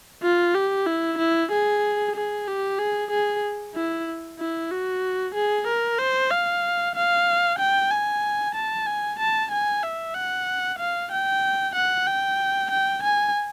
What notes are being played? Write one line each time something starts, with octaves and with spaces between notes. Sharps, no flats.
F4
G4
E4
E4
G#4
G#4
G4
G#4
G#4
E4
E4
F#4
G#4
A#4
C5
F5
F5
G5
G#5
A5
G#5
A5
G#5
E5
F#5
F5
G5
F#5
G5
G5
G#5